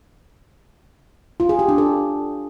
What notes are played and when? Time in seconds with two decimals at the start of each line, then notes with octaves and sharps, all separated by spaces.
1.40 F4
1.49 G#4
1.59 G4
1.69 D4
1.78 A4